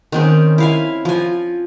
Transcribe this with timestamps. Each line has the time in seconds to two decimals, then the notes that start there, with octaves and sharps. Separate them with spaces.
0.12 D#3 C4 C#4
0.58 E4 F5 G#5
1.05 F3 G#5